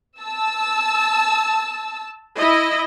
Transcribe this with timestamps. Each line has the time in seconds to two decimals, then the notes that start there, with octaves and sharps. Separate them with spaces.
0.20 A5 E6
2.36 E4 D#5